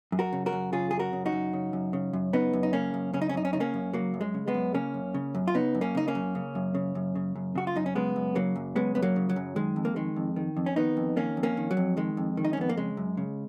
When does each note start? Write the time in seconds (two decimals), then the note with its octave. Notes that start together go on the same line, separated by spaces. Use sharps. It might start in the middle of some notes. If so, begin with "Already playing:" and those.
0.12 F#2
0.19 F#4 A#4
0.33 C#3
0.46 F#4 A#4
0.53 F#2
0.73 C#3 F4 G#4
0.91 F#2 G#4
0.99 F#4 A#4
1.13 C#3
1.26 D#4 F#4
1.33 F#2
1.53 C#3
1.73 F#2
1.93 C#3
2.13 F#2
2.33 C#3 B3 D#4
2.53 F#2
2.63 D#4
2.73 C#3 A#3 C#4
2.94 F#2
3.13 C#3 C#4
3.21 D#4
3.29 C#4
3.34 F#2 D#4
3.45 C#4
3.53 C#3 D#4
3.60 A#3 C#4
3.74 F#2
3.93 C#3 F#3 A#3
4.14 F#2
4.21 G#3
4.34 C#3
4.48 G#3 B3
4.54 F#2
4.74 C#3 A#3 C#4
4.94 F#2
5.14 C#3
5.35 F#2
5.48 F4
5.55 C#3 B3 D#4
5.75 F#2
5.81 A#3 C#4
5.95 C#3 D#4
6.08 A#3 C#4
6.15 F#2
6.35 C#3
6.55 F#2
6.75 C#3
6.95 F#2
7.15 C#3
7.36 F#2
7.55 C#3 F#4
7.67 F4
7.76 F#2 D#4
7.86 C#4
7.95 C#3 G#3 B3
8.16 F#2
8.35 C#3 F#3 A#3
8.56 F#2
8.76 C#3 G#3 B3
8.95 F#2 B3
9.02 F#3 A#3
9.16 C#3
9.29 F#3
9.36 F#2
9.56 D#3 G#3
9.76 F2
9.85 A#3
9.96 D#3 G#3
10.16 F2
10.36 D#3
10.57 F2
10.66 C#4
10.76 D#3 B3 D#4
10.97 F2
11.16 D#3 A#3 C#4
11.37 F2
11.43 A#3 C#4
11.57 D#3
11.71 F#3
11.77 F2
11.97 D#3 G#3
12.17 F2
12.37 D#3
12.45 D#4
12.53 C#4
12.57 F2 B3
12.69 A#3
12.77 C#3 G#3
12.97 F#2
13.17 C#3